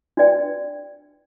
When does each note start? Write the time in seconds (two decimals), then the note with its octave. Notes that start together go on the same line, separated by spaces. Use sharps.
0.17 D4 F#4 B4 D5 G5